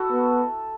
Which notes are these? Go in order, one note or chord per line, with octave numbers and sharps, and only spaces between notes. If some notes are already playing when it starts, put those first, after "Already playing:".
Already playing: E4 F#4 A4
B3